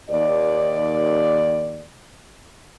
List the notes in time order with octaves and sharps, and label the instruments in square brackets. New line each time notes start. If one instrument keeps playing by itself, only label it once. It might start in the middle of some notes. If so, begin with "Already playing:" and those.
[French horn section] D#2 D5